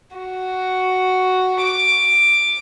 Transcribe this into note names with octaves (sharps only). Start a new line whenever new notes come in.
F#4
D6